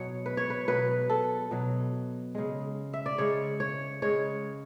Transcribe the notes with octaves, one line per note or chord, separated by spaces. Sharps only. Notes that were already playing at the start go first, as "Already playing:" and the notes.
Already playing: B2 F#3 C#5
B4
C#5
B4
B2 F#3 B4
A4
B2 F#3
C#3 G#3
E5
D5
C#3 G#3 C#5
C#5
C#3 G#3 C#5